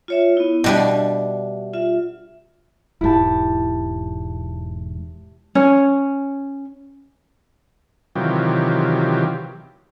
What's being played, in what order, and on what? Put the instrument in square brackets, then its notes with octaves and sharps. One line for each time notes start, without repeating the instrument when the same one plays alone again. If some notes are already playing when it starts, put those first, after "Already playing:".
[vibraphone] F4 C#5 E5
B3 E4
[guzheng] B2 G3 D4 [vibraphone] E5
[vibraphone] F4 E5
[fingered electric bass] E1 G#2 [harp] E4 G4 A5
[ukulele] C#4
[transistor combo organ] C3 D#3 E3 F#3 F4 G4